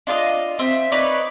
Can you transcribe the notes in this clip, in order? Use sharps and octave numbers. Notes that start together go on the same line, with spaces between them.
D4 F4 A#4 D#5
C4 E5
D#4 B4 C#5 D5